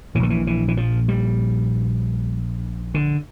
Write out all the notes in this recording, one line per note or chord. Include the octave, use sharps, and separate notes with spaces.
A#1 A#2 D3 E3
E3
E3
E3
F3
G3
D3